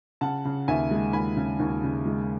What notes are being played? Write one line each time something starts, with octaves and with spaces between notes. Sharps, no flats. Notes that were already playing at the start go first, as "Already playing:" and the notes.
C#3 F#5 A5
C#3
D#2 E5 G#5
G#3
D#2 G#5 B5
C#3
D#2
C#3
G#3